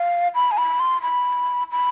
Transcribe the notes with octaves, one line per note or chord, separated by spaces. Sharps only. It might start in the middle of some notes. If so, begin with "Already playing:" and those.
Already playing: F5
B5
G#5
B5
C6
B5
B5